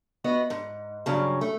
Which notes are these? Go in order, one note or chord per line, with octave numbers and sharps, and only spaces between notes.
B3 F#4 D#5
G#2
G2 C#3 F#3
A3